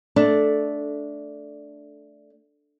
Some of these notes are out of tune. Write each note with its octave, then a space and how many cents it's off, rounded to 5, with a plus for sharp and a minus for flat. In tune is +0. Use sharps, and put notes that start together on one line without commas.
A3 -10 D4 -5